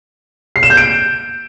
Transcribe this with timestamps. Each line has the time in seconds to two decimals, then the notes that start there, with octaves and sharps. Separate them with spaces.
0.56 C7
0.63 E7
0.70 G6
0.77 D7